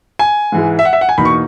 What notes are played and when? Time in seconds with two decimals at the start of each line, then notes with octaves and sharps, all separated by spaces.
0.19 G#5
0.52 G#2 E3 G#3
0.79 E5
0.85 F#5
0.93 E5
1.01 F#5
1.09 G#5
1.18 E2 B2 A#3 D#4 B5
1.25 C#6